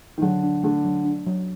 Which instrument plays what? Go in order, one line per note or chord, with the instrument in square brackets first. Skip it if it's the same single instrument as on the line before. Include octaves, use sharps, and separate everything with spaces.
[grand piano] D#3
[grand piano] D3 [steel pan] F#3
[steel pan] D4
[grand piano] D3 [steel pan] A3
[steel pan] F#3
D4
F#3